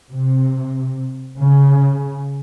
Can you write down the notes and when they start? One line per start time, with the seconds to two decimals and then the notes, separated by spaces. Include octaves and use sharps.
0.12 C3
1.40 C#3